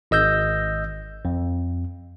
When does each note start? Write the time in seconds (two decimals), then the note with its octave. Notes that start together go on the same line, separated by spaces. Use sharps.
0.11 G#1 D#5 E6 G6 A#6
1.25 F2